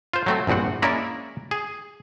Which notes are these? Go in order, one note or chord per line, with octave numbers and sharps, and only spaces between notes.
F4 C5
F#3 A3 C4
A#1 E2 G2 C4 F#5
G#3 A#3 C#4 E4 A#4 D5
G#4